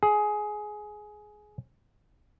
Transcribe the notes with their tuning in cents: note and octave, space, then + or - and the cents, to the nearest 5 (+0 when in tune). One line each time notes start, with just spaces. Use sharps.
G#4 +15